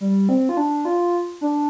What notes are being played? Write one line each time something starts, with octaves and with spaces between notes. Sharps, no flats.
G3
C4
F4
D4
F4
D4